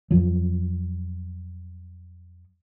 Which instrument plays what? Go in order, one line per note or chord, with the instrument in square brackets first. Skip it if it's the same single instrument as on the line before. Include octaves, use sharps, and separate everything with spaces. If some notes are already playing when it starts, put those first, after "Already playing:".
[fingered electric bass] F2 F3 F#3